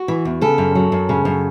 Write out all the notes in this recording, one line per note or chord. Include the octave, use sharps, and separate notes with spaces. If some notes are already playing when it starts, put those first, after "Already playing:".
Already playing: F#4
E3
E2
C#3 A4
F#2
F#3
F#2
C#3
F#2